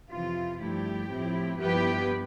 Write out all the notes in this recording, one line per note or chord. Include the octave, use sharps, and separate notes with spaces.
F2 C3 E3 F4
G2 F3 A3 E4 G4
A2 F3 C4 E4
G2 F3 B3 E4 G4 B4